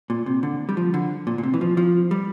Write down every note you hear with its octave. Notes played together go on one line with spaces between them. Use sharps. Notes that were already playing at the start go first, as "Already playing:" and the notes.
A#2
C3
D3
G3
F3
D3
A#2
A#2
C3
E3
F3
F3
G3